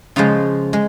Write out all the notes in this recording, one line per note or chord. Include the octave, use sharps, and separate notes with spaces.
C#3 F3 G#3 F4
G#3